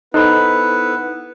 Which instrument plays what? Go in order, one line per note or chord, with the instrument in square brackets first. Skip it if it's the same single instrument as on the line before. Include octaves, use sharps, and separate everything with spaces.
[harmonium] B3 E4 B4 [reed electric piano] D#4 A4 C5 [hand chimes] B5 F#6